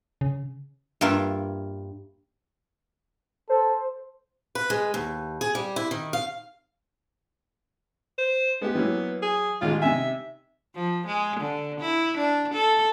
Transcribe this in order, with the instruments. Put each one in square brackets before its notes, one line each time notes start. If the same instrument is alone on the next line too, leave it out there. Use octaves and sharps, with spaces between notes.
[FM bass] C#3
[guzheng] G2 A#3 F4 A#4 E5 F5
[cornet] A4 [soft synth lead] C5
[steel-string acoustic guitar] B4
G#3
D#2
G#4
G3
E4
D#3
F5
[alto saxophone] C5
[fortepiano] G#3 G4 [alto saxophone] B3
[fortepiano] E3 F#3 A#3
[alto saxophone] G#4
[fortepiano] A1 D#3 G#3 [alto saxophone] F4
[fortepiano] C3 D#4 G#5 [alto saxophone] E5
[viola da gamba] F3
G#3
D3
E4
D4
A4